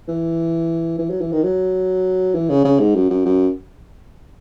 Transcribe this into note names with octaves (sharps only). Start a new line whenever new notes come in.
E3
E3
F#3
E3
D#3
F#3
E3
C#3
C#3
G#2
F#2
F#2
F#2